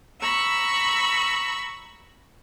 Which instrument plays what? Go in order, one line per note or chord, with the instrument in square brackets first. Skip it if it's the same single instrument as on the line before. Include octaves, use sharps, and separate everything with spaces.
[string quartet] A#5 B5 C#6 E6